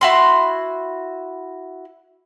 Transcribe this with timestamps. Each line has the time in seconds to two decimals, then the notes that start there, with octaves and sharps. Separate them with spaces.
0.01 E4 F#4 C6